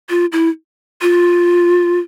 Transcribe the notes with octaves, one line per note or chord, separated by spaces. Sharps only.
F4
E4
F4